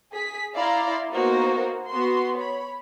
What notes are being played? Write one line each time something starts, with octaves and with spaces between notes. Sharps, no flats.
G#4 B6
E4 D5 F5 A#5 C6
A#3 B3 D#4 F#4 A#4 C5
B3 F#4 C6
C#5 B5